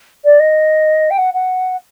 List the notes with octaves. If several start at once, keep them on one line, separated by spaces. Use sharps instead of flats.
D5
D#5
G5
F#5
F#5